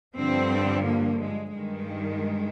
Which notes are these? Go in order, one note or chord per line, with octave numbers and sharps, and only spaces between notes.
G2 D3 F3 C4
A#3
G#3
G2 D#3 G#3